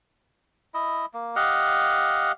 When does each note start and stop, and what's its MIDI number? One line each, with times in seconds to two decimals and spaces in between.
0.74 1.06 64
0.74 1.06 75
1.13 1.35 58
1.36 2.32 67
1.36 2.32 75
1.36 2.32 77
1.36 2.32 78